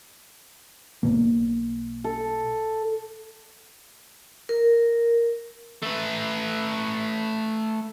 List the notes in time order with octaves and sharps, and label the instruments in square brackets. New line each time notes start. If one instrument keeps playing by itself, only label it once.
[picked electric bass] B1 B2 A#3
[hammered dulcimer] A4
[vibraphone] A#4
[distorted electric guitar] A3 B4